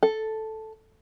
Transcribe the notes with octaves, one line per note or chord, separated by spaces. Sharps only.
A4